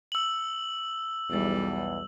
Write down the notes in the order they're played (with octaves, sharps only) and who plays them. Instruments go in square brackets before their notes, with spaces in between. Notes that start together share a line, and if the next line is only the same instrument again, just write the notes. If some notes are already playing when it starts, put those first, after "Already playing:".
[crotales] E6 F#7
[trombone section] B1 E2 [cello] G3